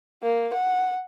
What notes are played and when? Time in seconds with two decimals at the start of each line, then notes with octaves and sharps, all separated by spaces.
0.23 A#3
0.54 F#5